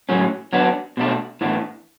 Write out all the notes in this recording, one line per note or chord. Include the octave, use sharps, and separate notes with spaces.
A2 F#3 C#4
F#3 B3 D4
B2 A3 D4
A2 E3 B3 D4